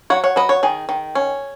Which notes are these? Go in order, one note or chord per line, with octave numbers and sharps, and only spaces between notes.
F#3 C#5 F#5
C#5 F#5
F#3 B4 D#5
C#5 F#5
D#3 G#4
D#3
C#4